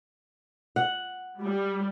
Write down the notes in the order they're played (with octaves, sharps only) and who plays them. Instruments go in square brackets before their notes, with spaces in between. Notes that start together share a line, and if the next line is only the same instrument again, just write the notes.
[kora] F#5
[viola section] G3